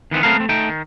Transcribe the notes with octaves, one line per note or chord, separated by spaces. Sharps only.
D#3 E3 B3 C4
A3 B3 C4 A4 A#4 F5
A3 C4
A3 D#4 G5
D#3